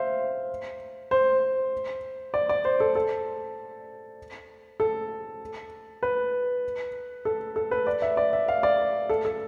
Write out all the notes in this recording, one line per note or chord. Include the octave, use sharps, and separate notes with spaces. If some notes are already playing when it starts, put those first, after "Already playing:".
Already playing: C5 E5 F5
C5
D5
D5
C5
A4
A4
A4
B4
A4
A4
B4
D5
E5
D5
E5
F5
D5
A4
A4